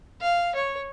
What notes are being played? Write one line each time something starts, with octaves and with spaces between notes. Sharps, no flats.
F5
C#5